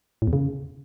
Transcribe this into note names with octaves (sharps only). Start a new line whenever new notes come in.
A2
E2
C#3